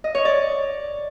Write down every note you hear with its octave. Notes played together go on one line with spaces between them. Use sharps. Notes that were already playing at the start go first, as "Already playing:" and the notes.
D#5
C#5
D5